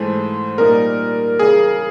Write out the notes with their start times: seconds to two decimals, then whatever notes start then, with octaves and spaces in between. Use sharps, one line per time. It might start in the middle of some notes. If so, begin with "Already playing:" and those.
Already playing: G#2 E3 A3 C5
0.58 A#2 G3 A#3 D#4 A#4
1.39 C#3 E3 G3 G#4